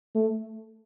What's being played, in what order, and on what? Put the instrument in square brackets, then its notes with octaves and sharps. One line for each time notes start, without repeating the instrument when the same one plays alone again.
[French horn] A3